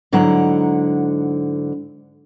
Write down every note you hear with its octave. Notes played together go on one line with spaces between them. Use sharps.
G#2 D3 F#3 E4 F#5 A#5